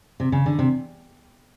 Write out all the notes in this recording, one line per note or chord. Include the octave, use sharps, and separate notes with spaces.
C3
C#3
D3
C3